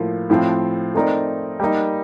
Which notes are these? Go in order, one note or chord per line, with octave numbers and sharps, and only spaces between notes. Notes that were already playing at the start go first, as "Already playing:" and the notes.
Already playing: A2 F3 A#3
A2 F3 C4
A3 C4 D#4 A#4 D5
G3 A#3 D#4